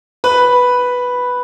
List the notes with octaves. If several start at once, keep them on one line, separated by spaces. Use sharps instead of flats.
B4 B5